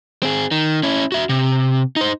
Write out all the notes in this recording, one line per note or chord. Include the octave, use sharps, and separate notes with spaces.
C4 G#4
D#3
C#4 E4
F#4 E5
C3
D#4 C5